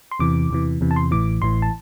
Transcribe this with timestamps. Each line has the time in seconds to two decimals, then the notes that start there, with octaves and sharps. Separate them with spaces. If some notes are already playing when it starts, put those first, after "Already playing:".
0.11 C6
0.20 E2 C3 E3 D6
0.50 E2 C3 E3
0.81 E2 C3 E3
0.91 A5
0.96 C6
1.11 A1 A2 E3 D6
1.42 A1 A2 E3 C6
1.62 A5